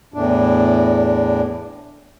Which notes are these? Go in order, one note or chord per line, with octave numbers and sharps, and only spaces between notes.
E2 A2 D4